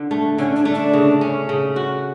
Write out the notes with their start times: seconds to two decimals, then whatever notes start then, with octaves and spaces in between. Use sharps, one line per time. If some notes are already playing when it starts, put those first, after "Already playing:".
Already playing: D3
0.11 A3
0.38 D3 C#4
0.56 D4
0.65 A3
0.74 D4
0.94 C#3
1.21 C#4
1.49 C#3
1.76 F#4